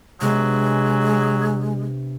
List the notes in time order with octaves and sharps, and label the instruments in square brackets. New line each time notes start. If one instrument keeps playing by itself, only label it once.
[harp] C3 B3 D4 [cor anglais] F#3 [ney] G#3